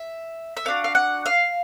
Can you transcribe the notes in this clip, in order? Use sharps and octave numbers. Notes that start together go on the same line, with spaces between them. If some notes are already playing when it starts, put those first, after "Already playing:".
Already playing: E5
E5
B3 D4 F#4 F5
F5
F#5
F5